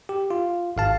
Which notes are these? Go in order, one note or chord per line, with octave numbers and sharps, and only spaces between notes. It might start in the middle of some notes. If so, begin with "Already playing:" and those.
G4
F4
G#1 F5 A5